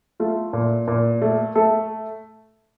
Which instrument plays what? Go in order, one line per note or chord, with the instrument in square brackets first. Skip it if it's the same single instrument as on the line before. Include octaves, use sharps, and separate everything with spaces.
[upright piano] A3 F4
A#2
A#2
A3
A3 A4